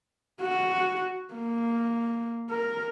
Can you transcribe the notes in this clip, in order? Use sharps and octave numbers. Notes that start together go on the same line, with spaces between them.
F#4
A#3
A#4